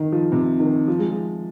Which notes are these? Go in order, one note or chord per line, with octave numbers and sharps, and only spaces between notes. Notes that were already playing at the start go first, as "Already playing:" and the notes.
Already playing: D#3
F3
C3
D#3
F3
G#3
F3